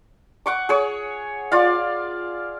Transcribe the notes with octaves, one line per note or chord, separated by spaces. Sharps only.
F#5 C#6 D6
G#4 C#5
F4 D5 F5